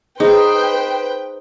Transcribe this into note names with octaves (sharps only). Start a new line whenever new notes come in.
D#4 G#4 B4 C5 G5